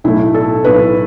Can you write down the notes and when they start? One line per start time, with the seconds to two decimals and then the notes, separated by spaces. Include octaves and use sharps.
0.04 B1 A2 A3 E4
0.34 A4
0.64 B1 A2 A3 B4